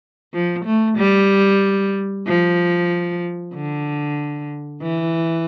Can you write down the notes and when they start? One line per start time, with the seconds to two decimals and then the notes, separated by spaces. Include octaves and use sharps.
0.34 F3
0.66 A3
0.98 G3
2.27 F3
3.55 D3
4.82 E3